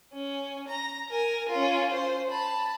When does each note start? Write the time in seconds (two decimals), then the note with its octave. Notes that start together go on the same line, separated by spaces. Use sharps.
0.13 C#4
0.68 A#5
1.10 A#4 G#5
1.49 C#4 F4
1.91 C5
2.31 A5 B5